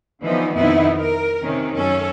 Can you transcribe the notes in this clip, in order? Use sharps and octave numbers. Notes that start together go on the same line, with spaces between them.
D3 E3 F3 B3 D#4
F2 B2 D#3 B3 D#4 E4
A#4
C3 D#3 C#4
F#2 C#4 A4